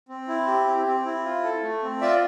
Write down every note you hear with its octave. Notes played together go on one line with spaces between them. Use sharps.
C4
E4
G4
C4
C4
E4
F4
A4
A3
C4
F4 D5 E5